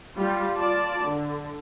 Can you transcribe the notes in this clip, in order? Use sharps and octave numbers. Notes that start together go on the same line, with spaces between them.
G3 F4
F4 D5 A5
D3